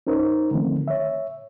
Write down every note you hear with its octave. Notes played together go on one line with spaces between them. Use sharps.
C#4 D#4 A#4 C5
D3 D#3 F3 A3 C4
C#5 E5